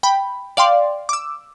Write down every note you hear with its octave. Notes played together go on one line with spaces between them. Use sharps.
G5 B5
D5 F5 G5 C6 D6
D6 E6